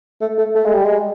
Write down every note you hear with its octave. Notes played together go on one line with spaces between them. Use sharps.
A3
A3
A3
G#3
G3
G#3